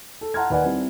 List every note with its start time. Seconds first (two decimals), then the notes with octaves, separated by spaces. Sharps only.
0.21 A4
0.34 F#5 A5 A#5 C6 F6 G#6
0.50 D#2 B4 D5 F#5 G#5
0.64 G3 C4 E4